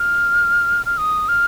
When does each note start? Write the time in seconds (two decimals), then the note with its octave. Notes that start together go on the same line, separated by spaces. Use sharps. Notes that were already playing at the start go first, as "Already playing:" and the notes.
Already playing: F6
0.86 F6
0.98 D#6
1.28 F6